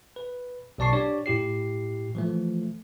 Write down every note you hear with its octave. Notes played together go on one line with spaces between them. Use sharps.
B4
B1 B2 D5 A5 C#6 C7
D4 G4 C#5 D5
A2 E4 G4 C7
E3 F3 A3